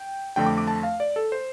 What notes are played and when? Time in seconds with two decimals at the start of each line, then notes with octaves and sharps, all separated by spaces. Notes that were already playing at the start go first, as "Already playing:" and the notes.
Already playing: G5
0.36 F2 D3 A3 G5
0.46 D6
0.58 D6
0.67 A5
0.83 F5
1.00 D5
1.16 A4
1.32 C5